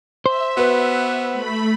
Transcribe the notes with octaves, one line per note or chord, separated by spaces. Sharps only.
C5 E5
B3 F#4 B4
A3 B5